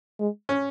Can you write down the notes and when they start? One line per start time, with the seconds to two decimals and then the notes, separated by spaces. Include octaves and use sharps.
0.20 G#3
0.49 C#4